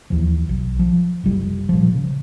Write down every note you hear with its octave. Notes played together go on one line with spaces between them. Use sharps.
D#2 E3 F3
B1
F3
F#1 C2 G3
A#2 F3
C#3